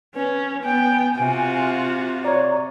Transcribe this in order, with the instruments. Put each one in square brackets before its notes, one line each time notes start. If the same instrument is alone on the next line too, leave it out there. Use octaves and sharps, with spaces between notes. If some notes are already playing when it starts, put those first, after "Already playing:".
[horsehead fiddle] C#4 [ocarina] B4
[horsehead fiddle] B3 G5 [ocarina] G#5
[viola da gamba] C3 [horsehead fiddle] F4 F#4
[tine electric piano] C#5 D5 [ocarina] A#5